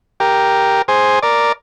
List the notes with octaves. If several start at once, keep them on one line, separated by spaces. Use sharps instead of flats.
G4 A#4
G#4 C5
A#4 D5